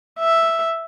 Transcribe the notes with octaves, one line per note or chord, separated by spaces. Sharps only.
E5